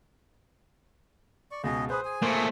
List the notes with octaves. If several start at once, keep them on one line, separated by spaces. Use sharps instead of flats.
D5 C#6
C#2 B2 G#4 D#5
G#4 B4 C5 D#6
G#4 G#5
A#2 A3 C5